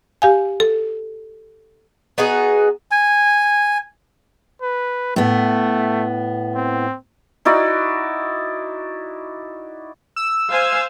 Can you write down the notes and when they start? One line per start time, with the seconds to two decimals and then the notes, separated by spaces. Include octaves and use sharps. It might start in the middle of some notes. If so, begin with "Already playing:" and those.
0.22 G4 F5 G#5
0.60 A4
2.18 B3 D#4 F#4 G#4
2.91 G#5
4.62 B4
5.16 A2 A3 B3
6.55 C4
7.45 D#4 E4 F#4 D5
10.16 E6
10.51 C5 F5 G#5